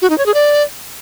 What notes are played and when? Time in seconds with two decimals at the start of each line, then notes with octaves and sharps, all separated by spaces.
0.02 F#4
0.10 D#4
0.18 C#5
0.26 G#4
0.34 D5